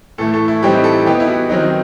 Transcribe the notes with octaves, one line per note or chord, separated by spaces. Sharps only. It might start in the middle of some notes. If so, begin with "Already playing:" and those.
A2 E3 A3 A4
A4
E4
A2 E3 G3 C4 D#4 G4
A4
E3 B3 D#4 G4
E4
F#4
D#3 F#3 C4 D#4